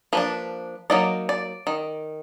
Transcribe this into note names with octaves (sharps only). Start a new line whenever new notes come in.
F3 A#3 D4 B4
F#3 A#3 D#4 D5
D5
D#3